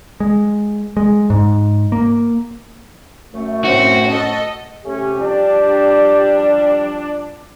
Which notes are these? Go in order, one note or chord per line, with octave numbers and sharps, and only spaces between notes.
G#3
G#3
G#2
A#3
F#2 A3
A2 C4 C#4 F#4
A4 D#5
C3 A3 C#4 G4
F3 G3 D4